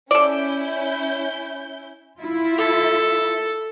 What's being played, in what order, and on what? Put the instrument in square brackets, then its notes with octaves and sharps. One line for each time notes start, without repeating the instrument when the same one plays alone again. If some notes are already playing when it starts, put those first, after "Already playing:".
[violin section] C#4 E4 G6 [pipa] A4 D5
[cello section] E4 F4
[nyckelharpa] A4